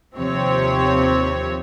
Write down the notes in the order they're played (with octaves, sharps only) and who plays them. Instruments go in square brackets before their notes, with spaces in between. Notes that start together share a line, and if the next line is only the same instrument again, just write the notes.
[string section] D#2 C3 F3 C4 C#5